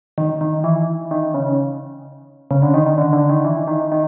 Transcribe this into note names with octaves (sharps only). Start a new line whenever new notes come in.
D#3
D#3
E3
D#3
C#3
C#3
D3
D#3
D#3
D3
D3
D#3
E3
D#3
D#3